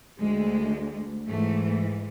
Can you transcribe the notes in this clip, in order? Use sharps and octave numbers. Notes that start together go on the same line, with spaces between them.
D2 D3 G#3
G#2 E3 A3